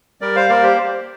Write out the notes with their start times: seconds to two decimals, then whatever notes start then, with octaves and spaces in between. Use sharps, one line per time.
0.21 G3 A#4 D5
0.36 C5 F5
0.49 A#3 A#4 D5
0.63 G4 C5